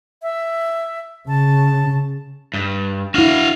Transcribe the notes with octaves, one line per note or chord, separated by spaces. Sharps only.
E5
C#3 A5
G2
D4 E4 F#4 F5